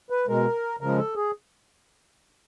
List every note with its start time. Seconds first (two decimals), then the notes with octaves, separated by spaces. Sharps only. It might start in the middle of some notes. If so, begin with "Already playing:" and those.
0.10 B4
0.27 B2 G#3 A#4
0.81 C#3 F3 G#3 A#4
0.98 A4
1.15 G#4